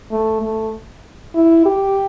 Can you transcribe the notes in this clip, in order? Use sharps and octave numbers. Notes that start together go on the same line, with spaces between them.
A3
A3
E4
G4